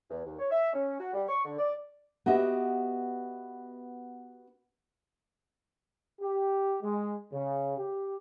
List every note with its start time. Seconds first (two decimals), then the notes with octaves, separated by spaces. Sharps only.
0.10 E2
0.24 D#2
0.39 C#5
0.51 E5
0.73 C#4
0.99 F#4
1.14 G3
1.28 C#6
1.45 D3
1.59 D5
2.26 B3 F#4 G4 D#5 E5
6.21 G4
6.83 G#3
7.33 C#3
7.78 G4